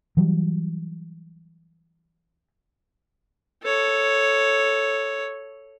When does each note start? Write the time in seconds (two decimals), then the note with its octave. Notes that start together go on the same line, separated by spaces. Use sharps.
0.17 E3 F#3 G3
3.63 A4 C#5